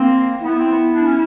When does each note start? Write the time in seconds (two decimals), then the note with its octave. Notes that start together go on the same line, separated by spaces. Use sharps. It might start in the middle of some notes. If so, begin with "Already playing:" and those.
Already playing: A#3 C4
0.44 B3 E4
0.58 C4
0.71 B3
0.94 D4
1.06 C#4